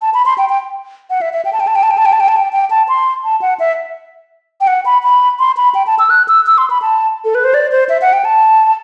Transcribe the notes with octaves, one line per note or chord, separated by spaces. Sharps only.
A5
B5
C6
G5
G5
F#5
E5
E5
G5
A5
G5
A5
G5
A5
G5
A5
G5
A5
G5
A5
G5
G5
A5
C6
A5
F#5
E5
G5
F#5
B5
B5
C6
B5
G5
A5
E6
F#6
E6
E6
C6
B5
A5
A4
B4
C5
D5
C5
E5
F#5
G5
A5